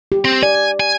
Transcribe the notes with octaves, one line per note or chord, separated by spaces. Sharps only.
G4
C4
D5 G#5
G#5